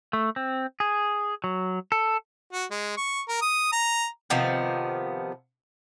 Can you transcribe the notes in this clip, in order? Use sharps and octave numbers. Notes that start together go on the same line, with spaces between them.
A3
C4
G#4
F#3
A4
F#4
G#3
C#6
A#4
D#6
A#5
C3 D#3 F3 B3